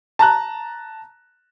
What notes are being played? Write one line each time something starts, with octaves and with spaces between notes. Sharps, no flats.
A5 A#5 F#6